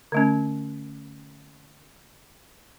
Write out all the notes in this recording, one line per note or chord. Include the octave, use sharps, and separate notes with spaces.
D3 A3 C#4